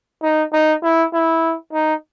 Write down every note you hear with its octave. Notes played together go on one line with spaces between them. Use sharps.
D#4
D#4
E4
E4
D#4